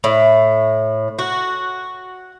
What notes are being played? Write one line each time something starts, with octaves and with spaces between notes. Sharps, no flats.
A2
F#4